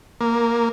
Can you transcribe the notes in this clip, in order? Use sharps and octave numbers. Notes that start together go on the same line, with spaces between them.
A#3